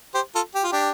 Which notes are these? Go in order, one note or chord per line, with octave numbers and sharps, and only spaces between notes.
G4 C5
F4 A4
G4
F4
D4 G4